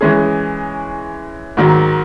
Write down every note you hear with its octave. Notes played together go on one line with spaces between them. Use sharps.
E3 G#3 C#4 G#4
G#2 D#3 F#3